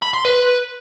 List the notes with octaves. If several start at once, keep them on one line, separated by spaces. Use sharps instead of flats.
B5
C6
B4